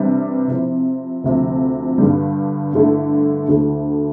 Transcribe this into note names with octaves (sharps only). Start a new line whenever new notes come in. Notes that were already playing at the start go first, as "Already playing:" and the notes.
Already playing: C3 E3 G3 D4
C3 F3 C4 E4
D2 C3 F3
G2 D3 G3
G2 D3 A3 E4
D2 D3 A3 E4